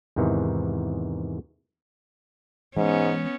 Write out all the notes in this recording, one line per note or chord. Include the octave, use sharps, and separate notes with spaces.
E2 G#2 C3 D#3 E3
G#2 E3 G#3 B3 C#4